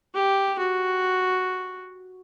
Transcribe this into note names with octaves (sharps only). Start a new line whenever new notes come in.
G4
F#4